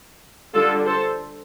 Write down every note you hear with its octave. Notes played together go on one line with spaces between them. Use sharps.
D3 G3 D4 F4 A4
A4 C5